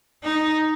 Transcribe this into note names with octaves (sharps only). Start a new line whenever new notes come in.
D#4